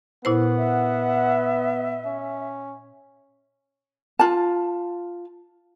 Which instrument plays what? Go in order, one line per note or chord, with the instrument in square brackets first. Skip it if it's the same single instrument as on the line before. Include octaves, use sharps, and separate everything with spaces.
[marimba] A#2 E4 C5 [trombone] B3 [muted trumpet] F#5
[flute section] D#5 E5
[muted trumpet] C#4
[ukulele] F4 A5